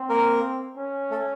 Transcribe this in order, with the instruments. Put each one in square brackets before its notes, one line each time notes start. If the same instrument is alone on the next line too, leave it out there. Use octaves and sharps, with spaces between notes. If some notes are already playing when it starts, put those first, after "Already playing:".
Already playing: [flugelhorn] C4
[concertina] A#3 A#4
[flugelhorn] C#4
[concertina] A3 A4